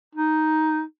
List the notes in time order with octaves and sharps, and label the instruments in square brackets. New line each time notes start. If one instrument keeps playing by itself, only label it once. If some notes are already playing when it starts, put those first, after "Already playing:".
[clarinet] D#4